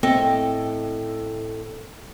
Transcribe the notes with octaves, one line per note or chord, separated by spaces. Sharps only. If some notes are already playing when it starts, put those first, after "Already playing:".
A2 C4 A4 D#5 G5